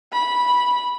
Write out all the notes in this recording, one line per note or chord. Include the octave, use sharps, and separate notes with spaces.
B5